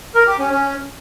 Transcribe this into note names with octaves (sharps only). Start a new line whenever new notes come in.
A#4
G4
C#4
C#4